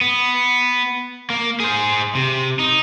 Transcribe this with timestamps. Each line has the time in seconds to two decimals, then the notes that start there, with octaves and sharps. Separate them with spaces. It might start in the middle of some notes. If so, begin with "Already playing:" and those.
0.01 B3
1.30 A#3
1.60 G#4 C5
2.15 C3
2.59 D#4